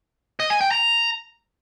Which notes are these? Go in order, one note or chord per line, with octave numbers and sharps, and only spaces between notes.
D#5
G#5
G5
A#5